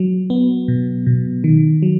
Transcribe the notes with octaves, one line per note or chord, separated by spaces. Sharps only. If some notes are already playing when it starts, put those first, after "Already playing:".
Already playing: F#3
B3
B2
B2
D#3
F#3